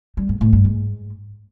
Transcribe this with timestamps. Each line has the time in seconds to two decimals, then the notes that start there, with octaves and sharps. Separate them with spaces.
0.17 G3
0.29 G#2
0.41 A2
0.53 G2
0.65 G#2